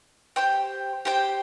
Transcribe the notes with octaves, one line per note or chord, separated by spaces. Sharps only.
G4 C5 G5
G4 C5 G5